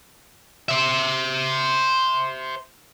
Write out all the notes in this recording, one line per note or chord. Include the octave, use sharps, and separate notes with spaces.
C5 E5